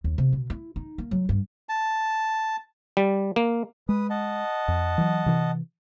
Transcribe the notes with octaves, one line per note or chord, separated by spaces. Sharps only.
D#2
C3
B2
E4
D#4
A#3
F#3
G2
A5
G3
A#3
G#3 B4 D#6
D#5 F#5 A5
F2
E3 F#3
C3 E3